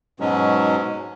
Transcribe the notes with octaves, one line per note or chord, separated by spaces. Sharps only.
G#2 B2 F#3 G#3 C#4